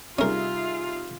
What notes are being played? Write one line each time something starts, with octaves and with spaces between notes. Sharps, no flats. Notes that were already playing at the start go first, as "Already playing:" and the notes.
C3 G3 C#4 D#4 F4 G#4 A#4 E5